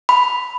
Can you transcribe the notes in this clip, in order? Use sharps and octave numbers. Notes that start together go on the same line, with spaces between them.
B5